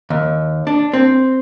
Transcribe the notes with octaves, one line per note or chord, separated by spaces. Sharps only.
D#2
D4
C4